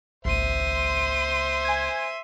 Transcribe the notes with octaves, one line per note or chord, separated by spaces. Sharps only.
G#1 C#2 A#3 C5 E5 C6 D#7
G#5 G#6